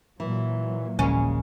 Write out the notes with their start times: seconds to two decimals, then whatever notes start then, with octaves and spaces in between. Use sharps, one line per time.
0.20 A#2 E3 F#3
0.99 D#1 A#1 D#2 C#3 G#3 A#3 C#4